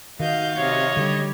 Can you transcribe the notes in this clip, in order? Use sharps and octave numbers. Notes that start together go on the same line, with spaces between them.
D#3 F#4 D#5 F5 G6
C3 C#5 D#5
D3 G3